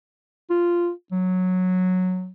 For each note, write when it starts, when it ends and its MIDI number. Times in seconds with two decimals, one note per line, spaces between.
0.50 0.90 65
1.12 2.30 54